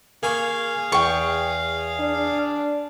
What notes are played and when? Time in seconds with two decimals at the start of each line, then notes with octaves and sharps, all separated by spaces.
0.23 A#3 G#4 F5 G#5 C#6
0.92 E2 G5 C#6
2.00 D4